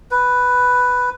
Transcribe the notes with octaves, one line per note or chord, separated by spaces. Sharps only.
B4